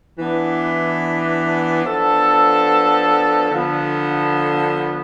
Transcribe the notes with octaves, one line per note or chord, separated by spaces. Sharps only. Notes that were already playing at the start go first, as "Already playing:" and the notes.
E3 B3 D4
F3 B3 D4 A4
D3 F3 B3